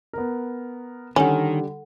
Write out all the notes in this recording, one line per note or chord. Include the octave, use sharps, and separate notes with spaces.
B3 A#4
D3 D#3 G3 C#4 A4 F#5